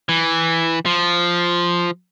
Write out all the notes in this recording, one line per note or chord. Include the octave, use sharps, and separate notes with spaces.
E3
F3